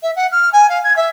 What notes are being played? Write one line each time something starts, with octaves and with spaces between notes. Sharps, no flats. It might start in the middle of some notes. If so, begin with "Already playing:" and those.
E5
F#5
F6
G#5
F5
G#6
E5